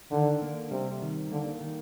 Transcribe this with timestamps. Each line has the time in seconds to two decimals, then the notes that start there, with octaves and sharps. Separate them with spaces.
0.11 D3 D#3
0.42 A#3
0.71 C3 G3
1.02 D#3
1.31 D3 A#3
1.61 D#3